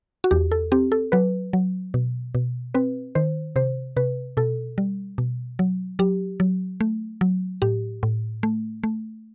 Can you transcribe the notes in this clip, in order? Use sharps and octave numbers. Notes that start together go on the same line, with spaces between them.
F#4
E2 G4
A4
C4 G4
A4
F#3 B4
F#3
B2
B2
C4 B4
D#3 C5
C3 C5
C3 B4
B2 A4
G3
B2
F#3
F#3 G4
F#3
A3
F#3
A2 G4
A2
A3
A3